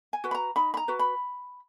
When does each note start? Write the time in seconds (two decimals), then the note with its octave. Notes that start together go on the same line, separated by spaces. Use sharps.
0.13 G#5
0.24 F#4 B4
0.31 B5
0.34 A#5
0.56 D#4 B5
0.74 B5
0.77 A#5
0.88 F#4 B4
0.99 B5